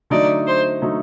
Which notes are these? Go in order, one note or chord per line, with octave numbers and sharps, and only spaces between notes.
D3 F#3 A3 D#4 D5
C5
D3 F#3 A3 D#4